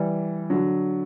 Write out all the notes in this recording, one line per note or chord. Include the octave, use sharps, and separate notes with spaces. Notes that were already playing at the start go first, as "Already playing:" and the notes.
Already playing: E3 G3
D3 F#3